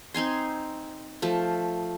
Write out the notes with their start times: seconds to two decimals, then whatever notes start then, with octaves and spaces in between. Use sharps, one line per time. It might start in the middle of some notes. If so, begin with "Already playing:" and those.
0.14 C4 D#4 G#5 C6
1.22 F3 A3